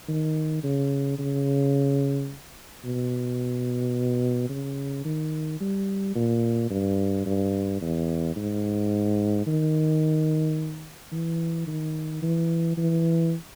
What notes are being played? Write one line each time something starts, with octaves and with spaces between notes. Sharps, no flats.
D#3
C#3
C#3
B2
C#3
D#3
G3
A#2
G2
G2
E2
G#2
D#3
E3
D#3
E3
E3